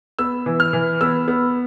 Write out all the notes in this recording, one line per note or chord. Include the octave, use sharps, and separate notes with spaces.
B3 E6
E3
F6
E3
B3 E6
B3